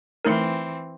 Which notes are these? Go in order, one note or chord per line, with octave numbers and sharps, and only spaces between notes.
E3 A3 C4 D#4 A#4